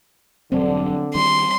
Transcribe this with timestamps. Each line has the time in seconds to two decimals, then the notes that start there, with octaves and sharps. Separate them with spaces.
0.52 E1 G2 D3 F#3 C4
1.15 D#3 G3 D4 C6